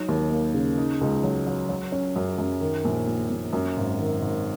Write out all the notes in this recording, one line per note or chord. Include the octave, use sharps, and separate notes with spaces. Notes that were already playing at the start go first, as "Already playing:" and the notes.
Already playing: F#3 D#4
D#2
A#3
C#3
D#4
C#2
F#3
F#3
F#3
C#4
F#2
F#2
D#3
A#1
A#1
A#1
F#2
G#1
D#3
G#1